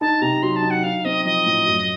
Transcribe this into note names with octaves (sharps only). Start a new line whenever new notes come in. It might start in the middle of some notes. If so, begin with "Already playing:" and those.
D#4 A5
C3 A#5
F#3 C6
A5
D#4
F#5
D#4 F5
C4 D#5
F3 D#5
A2
F#2